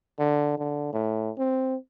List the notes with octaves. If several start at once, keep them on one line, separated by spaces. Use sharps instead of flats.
D3
D3
A2
C4